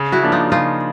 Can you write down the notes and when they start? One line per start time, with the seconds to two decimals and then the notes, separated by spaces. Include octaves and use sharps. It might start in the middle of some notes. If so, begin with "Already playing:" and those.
Already playing: C#3
0.12 E4 F#4
0.23 F3 A#3 D4
0.32 D#4 F4
0.52 C#3 D#4 F4